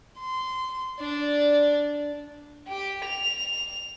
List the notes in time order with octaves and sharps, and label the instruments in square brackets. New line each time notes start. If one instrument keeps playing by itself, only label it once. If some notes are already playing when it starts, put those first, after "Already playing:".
[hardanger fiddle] C6
D4 D5
[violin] G4
F7